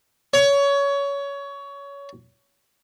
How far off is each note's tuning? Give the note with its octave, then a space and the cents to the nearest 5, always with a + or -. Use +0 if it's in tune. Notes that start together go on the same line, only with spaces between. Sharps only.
C#5 +20